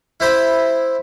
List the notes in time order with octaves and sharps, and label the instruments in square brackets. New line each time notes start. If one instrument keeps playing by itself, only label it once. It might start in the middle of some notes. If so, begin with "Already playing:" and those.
[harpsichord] E4 C5 B5